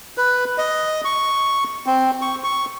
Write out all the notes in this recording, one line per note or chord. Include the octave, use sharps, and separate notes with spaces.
B4
D#5
C#6
C4
C#6
C#6